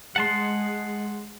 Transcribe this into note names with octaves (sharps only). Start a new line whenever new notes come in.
G#3 F#5 A5 C6